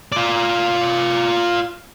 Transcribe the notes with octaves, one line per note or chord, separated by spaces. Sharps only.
F4 D5